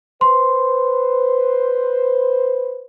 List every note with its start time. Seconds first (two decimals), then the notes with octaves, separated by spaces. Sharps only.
0.21 B4 C5 C6